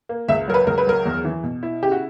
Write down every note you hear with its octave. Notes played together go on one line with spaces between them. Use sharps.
A#3
C#2 E5
F#3 A#4
B4
C#2 A#4
B4
F#3 A#4
E2
E3
B2
E4
C#3 G4
F#4